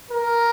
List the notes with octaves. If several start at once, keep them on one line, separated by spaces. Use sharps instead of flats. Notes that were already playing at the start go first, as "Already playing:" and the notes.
A#4